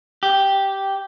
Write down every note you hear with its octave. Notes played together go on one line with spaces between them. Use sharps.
G4